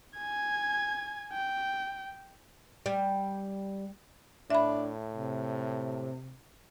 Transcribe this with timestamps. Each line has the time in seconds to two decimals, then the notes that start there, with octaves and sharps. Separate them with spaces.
0.17 G#5 G#6
1.32 G5
2.86 G3
4.50 A2 D4 E5 B5
5.15 C3